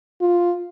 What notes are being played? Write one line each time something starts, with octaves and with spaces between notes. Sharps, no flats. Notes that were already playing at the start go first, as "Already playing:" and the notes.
F4